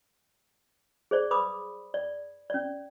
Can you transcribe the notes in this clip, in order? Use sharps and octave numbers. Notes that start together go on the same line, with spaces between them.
G#4 C5 D5
B4 B5 D6 D#6
D5
C#4 D5